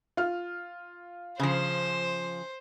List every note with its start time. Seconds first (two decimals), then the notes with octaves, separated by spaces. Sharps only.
0.17 F4 F6
1.39 C#3 F3 C5